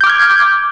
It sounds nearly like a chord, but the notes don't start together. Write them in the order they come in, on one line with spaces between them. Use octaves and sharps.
G6 D6 F6 G#6